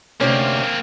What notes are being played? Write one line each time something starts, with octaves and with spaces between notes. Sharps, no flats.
D2 C3 A#3 C4 C#4